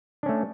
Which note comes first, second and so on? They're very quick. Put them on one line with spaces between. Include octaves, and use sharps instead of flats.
D4 C#4 A3